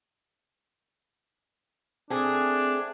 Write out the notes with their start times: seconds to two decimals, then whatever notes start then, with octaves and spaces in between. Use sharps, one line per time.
2.10 A3 C4 D4 G#4